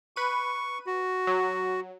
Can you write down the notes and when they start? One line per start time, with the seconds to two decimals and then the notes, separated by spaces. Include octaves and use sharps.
0.16 B4 C#6 D#7
0.87 F#4
1.27 F#3